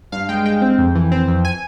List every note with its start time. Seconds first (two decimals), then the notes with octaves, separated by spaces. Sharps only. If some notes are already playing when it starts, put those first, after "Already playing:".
0.12 G2 F5
0.29 G#3 G5
0.46 G#3 G5
0.62 C4
0.78 F2
0.95 E3
1.12 C4
1.28 F2
1.45 G#5